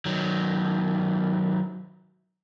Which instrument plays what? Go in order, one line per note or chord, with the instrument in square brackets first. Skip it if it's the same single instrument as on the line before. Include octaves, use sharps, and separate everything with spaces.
[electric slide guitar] D#3 F#3